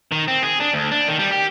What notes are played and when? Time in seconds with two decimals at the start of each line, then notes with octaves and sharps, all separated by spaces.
0.12 D#3
0.28 C4
0.43 G#4
0.60 D4
0.74 D2
0.91 D4
1.08 D#3
1.19 G3
1.31 G4